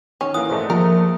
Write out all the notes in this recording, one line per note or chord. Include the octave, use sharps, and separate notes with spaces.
D#3 C#4
E3 A#3 F#5 D#6
G#2 G#3 A3 C5 D5 D#5
F3 A#3 F4 A#4